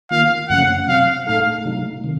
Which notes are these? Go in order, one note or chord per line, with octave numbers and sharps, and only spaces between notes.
D#3 A#3 F4 F5
F#2 C#3 F3 A3 C#4 F#5
C3 F#3 C4 F5
A2 A3 D#4 A4 F5
C3 F#3 A3 D#4
C3 D#3